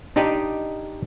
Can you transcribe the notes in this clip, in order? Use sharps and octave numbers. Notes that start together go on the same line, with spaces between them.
D4 D#4 G4 D5 D#5